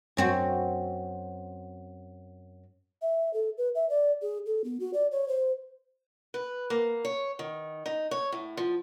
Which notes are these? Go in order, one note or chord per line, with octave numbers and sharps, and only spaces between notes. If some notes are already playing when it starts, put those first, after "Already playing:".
F#2 C4 F#4
E5
A4
B4
E5
D5
G#4
A4
B3
F#4
D5
C#5
C5
B4
A#3
C#5
D#3
D#4
C#5
A2
F3